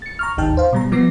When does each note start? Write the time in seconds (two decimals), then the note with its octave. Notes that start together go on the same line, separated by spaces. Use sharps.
0.02 A6 C#7
0.19 A#5 C#6 F6
0.37 G#1 D#2 D#4 G5 A5 F6
0.57 C5 F5
0.73 B2 G3 A#5
0.92 F3 B3 D6 A#6 C7